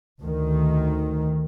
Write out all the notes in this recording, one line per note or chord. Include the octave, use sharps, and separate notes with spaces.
D2 D#3